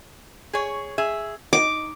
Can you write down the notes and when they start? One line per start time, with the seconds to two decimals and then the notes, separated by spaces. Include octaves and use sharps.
0.53 G#4 C#5
0.98 G#4 E5
1.53 D#4 D6